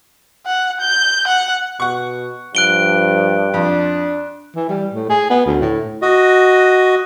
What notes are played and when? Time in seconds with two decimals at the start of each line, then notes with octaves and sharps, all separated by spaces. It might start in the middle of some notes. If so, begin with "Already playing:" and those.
0.46 F#5
0.80 G6
1.27 F#5
1.80 B2 F#5 C#6
2.55 G2 F3 F#6 D7 G7
3.54 F2 D4
4.56 E3
4.69 G3
4.94 A2
5.10 G#4
5.30 B3
5.46 D2
5.61 A2
6.02 F#4 D#5